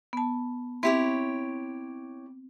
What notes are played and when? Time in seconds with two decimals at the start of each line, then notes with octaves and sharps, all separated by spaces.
0.13 B3 A5
0.83 C4 E4 G4 C#5